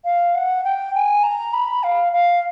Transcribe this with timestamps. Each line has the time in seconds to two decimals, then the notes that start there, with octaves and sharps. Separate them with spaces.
0.05 F5
0.35 F#5
0.64 G5
0.94 G#5
1.23 A#5
1.53 B5
1.83 F5
2.13 F5